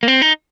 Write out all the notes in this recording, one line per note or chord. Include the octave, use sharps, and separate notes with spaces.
A#3
C4
D#4